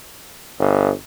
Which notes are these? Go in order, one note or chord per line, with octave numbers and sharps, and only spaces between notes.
G1